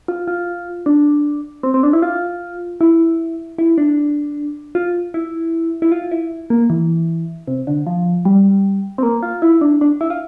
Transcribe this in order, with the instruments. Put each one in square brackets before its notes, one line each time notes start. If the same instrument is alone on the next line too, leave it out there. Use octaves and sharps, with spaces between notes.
[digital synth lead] F4
F4
D4
C4
C4
D4
E4
F4
E4
E4
D4
F4
E4
E4
F4
E4
A#3
E3
C3
D3
F3
G3
C4
A#3
F4
E4
D4
D4
E4
F4